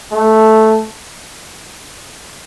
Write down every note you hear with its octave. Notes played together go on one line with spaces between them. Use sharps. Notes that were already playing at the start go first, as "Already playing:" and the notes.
A3